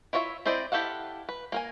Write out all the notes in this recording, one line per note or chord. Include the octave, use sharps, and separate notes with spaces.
E4 F4 C#5 D5 E5
C4 E4 C5 D5 D#5
E4 G4 A4 F5 F#5
B4
A#3 A#4 G#5